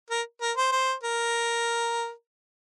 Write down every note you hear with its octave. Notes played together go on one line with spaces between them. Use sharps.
A#4
A#4
C5
C5
A#4